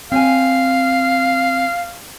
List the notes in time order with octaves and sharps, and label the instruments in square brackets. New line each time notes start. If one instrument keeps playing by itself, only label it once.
[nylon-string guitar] C4 C#5 G#5 [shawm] F5